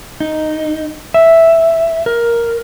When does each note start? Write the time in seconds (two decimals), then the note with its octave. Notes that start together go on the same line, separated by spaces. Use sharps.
0.20 D#4
1.14 E5
2.06 A#4